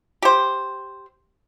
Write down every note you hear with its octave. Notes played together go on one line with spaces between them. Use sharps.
G4 C5